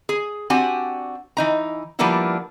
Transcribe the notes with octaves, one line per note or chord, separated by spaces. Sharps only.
G#4
C4 D4 F#4 G4 G#5
E3 D#4 A#5
F3 G3 A#3 B3 D4 E4